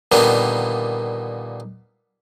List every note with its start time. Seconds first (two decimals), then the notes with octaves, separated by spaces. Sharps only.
0.12 A#2 D3 D#3 G3 A#3 B3